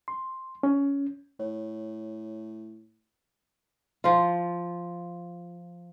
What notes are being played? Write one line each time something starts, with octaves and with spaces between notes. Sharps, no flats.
C6
C#4
A2 C#5
F3 F4